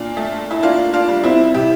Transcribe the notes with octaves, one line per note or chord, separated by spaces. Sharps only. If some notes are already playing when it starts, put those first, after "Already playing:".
Already playing: A#2 D4 F4
A3
E4
A#3 D4 F4
D4 F4
G3
C4 E4
C3 E4 G4